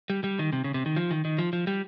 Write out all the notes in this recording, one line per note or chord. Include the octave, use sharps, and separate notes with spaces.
G3
G3
D#3
C3
C#3
C3
D#3
F3
D#3
D#3
F3
F3
G3